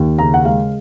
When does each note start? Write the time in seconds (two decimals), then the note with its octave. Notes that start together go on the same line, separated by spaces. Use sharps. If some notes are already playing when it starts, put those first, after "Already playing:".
Already playing: D#2
0.18 C#3 A#5
0.34 F#5
0.45 G#3 F5